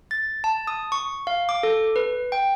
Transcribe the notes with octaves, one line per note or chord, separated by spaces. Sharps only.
A6
A5
D#6
C#6
F5
D6
A4
B4
G5